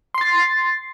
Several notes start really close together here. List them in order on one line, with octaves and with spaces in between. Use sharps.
C6 C7 A6